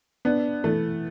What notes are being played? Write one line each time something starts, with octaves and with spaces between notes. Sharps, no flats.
B3 D4
E3 A3